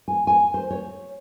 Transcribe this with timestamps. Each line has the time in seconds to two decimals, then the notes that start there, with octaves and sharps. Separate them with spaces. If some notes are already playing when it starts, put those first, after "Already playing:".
0.08 G#5
0.27 G#5
0.54 C5
0.71 C#5